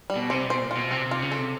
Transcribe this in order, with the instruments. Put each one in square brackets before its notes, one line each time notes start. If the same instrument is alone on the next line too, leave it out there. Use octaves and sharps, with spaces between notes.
[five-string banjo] G3
[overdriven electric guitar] B2
[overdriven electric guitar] C3 [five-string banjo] C5
[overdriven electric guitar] B2 [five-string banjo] C5
[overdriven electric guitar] A#2
[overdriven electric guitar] B2 [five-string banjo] F4
[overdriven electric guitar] C3 [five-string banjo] C4
[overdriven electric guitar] C3
[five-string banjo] F4
[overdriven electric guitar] C#3
[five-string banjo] A4
[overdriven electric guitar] C3